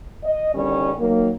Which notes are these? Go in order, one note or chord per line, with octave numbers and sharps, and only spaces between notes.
D#5
E2 D3 D#3 G3 C#4
D#3 F#3 A#3